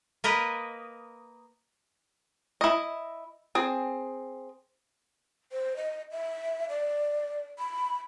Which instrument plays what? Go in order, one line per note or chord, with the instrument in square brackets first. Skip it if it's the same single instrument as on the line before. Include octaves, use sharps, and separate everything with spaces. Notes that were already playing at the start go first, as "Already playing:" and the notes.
[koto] A#3 A#4 B4 D#5
[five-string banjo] E4 D#5
C4 G#4
[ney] C5
D#5
E5
D5
B5